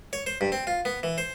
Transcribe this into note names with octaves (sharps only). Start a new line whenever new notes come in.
C#5
C5
G2
C4
F4
B3
E3
C5